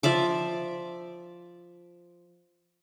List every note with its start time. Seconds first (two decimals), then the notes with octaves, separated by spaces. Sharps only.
0.03 F3 D5 E5 D6